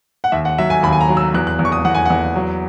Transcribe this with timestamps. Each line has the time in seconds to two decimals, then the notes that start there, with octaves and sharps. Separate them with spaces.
0.24 F#5
0.32 D#2 E5
0.45 F#5
0.58 F#3 E5
0.70 G#5
0.83 D#2 B5
0.92 G#5
1.01 A#5
1.09 F#3
1.17 E6
1.34 E2 F#6
1.47 F#6
1.59 E2
1.65 C#6
1.72 D#6
1.85 E2 F#5
1.94 G#5
2.05 E2 F#5
2.36 F#3